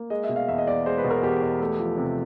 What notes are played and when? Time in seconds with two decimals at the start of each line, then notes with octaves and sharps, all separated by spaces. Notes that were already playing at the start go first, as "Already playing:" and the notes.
Already playing: A#3
0.10 G#3 D#5
0.24 E5
0.29 B2
0.36 F5
0.48 E2 E5
0.58 D#5
0.67 E2 D5
0.86 G#3 C5
0.98 B4
1.04 B2
1.10 A#4
1.22 E2 G4
1.42 E2
1.61 A3
1.79 F3
1.97 C3